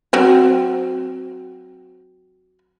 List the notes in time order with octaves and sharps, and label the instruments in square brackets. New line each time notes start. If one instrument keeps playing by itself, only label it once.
[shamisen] F#3 C4 F#4